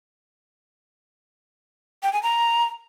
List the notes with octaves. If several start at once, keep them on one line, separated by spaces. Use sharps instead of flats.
G5
G#5
A#5